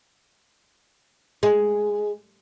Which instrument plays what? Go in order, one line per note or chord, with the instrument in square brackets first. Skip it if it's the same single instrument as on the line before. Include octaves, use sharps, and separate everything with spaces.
[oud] G#3